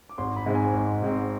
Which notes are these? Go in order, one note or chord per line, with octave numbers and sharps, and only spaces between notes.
D6
G#1 C6
B5
G#2 G#3 C4
G#5
G#1
G#2 G#3 C4